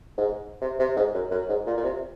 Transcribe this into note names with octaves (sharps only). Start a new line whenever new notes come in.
G#2
C3
C3
G#2
F#2
F#2
G#2
A#2
A#2
C3